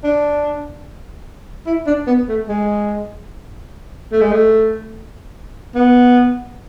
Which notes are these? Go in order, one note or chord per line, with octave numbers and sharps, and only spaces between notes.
D4
E4
D4
B3
A3
G#3
A3
G#3
A3
B3